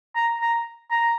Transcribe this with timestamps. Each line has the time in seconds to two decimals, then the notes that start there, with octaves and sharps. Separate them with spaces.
0.15 A#5
0.41 A#5
0.91 A#5